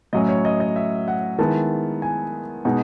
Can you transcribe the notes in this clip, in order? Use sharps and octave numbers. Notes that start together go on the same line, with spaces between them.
A2 F#3 C#4 D#5
C#5
D#5
D#5
E5
F#5
D#3 G#3 B3 E4 A5
G#5
B2 G#3 D#4 F#5